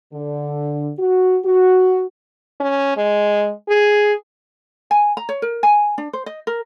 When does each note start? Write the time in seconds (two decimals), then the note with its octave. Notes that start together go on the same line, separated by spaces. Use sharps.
0.14 D3
0.99 F#4
1.45 F#4
2.60 C#4
2.97 G#3
3.68 G#4
4.91 G#5
5.17 A#5
5.29 C#5
5.42 A#4
5.63 G#5
5.98 D4
6.13 C5
6.26 D#5
6.47 A#4